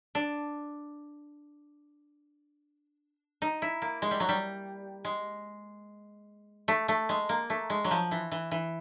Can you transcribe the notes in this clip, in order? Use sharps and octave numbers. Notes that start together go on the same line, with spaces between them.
D4
D#4
E4
A#3
G#3
G3
F#3
G3
G#3
A3
A3
G#3
A#3
A3
G#3
F#3
F3
E3
E3
E3